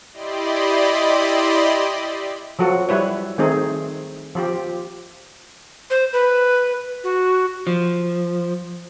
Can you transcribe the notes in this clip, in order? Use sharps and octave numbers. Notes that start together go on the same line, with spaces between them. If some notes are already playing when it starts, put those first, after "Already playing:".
E4 G4 D5 D#5 B5 C6
F3 F#3 F#4 A4
G3 E4 B4 C#5
D#3 A3 C4 D#4 G#4
F3 F4 G4
C5
B4
F#4
F3